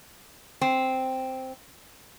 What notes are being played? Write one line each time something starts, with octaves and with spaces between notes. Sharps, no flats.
C4